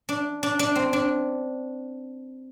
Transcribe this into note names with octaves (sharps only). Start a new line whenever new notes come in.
D4
D4
D4
C4
D4